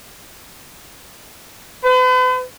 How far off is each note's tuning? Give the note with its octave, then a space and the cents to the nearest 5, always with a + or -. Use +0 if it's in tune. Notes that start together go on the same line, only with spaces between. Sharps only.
B4 +45